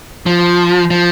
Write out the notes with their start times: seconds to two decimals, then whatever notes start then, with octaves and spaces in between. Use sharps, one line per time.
0.26 F3
0.90 F3